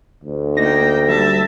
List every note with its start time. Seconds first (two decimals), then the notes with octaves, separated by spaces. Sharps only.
0.24 D2
0.57 A#3 D#4 G5 A#6
1.08 G3 E5 A5